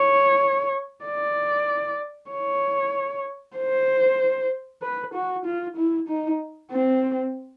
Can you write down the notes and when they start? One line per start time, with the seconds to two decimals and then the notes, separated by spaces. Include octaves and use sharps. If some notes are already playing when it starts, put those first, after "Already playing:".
Already playing: C#5
1.05 D5
2.31 C#5
3.57 C5
4.82 B4
5.14 F#4
5.45 F4
5.77 E4
6.08 D#4
6.72 C4